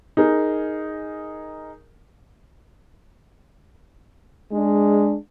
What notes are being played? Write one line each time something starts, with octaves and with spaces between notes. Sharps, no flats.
D#4 G#4 A#4
G#3 D4